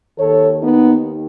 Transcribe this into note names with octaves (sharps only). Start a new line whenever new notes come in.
D#2 D#3 A4 C#5
B3 D#4